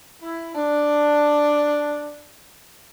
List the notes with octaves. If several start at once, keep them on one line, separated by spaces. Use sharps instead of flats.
E4
D4